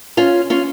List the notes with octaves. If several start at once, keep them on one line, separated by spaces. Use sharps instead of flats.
C#4 F4
C#4 F4